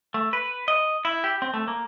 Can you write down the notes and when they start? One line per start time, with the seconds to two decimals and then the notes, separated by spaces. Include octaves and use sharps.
0.14 A3
0.33 B4
0.68 D#5
1.05 E4
1.24 G4
1.42 C4
1.54 A3
1.68 A#3